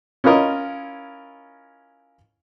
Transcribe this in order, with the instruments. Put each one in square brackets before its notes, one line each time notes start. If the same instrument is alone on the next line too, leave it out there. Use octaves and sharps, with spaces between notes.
[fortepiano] C#4 E4 F4 A#4 D#5